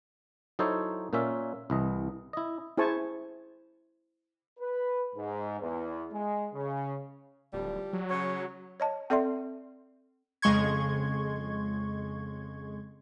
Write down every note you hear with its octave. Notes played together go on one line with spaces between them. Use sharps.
F#3 D#4 E4 A4 C5 C#5
A#2 A#3 C#4 F4 E5
C2 E3 D#5
E4 D#5
E4 G#4 C5 G#5 A5 C#6
B4
G#2
E2
G#3
C#3
D1 F3 G3
F#3
C#3 C#5
C#5 D#5 A5
C4 A4 D5 E5 C6
F2 C#3 G#3 C6 C#6 G#6